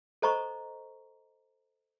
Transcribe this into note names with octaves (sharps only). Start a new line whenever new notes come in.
A4 C5 D#5 A#5 C#6